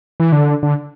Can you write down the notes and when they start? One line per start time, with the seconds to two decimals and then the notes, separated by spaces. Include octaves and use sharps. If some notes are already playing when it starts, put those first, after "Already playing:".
0.20 E3
0.32 D3
0.63 D3